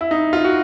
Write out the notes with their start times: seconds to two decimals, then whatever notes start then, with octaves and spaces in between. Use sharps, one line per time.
0.01 E4
0.11 D#4
0.33 F4
0.45 F#4